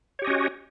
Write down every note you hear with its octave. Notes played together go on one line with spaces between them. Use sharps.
C#4 F#4 G4 C#5 D#5